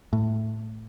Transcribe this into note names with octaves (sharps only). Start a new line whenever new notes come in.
A2